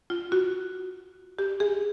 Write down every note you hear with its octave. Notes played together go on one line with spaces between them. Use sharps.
F4
F#4
G4
G#4